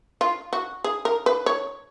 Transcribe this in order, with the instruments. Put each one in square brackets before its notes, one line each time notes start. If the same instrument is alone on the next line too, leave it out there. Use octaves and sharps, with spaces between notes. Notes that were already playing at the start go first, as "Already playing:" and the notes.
[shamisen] F4
F#4
G#4
A#4
B4
C#5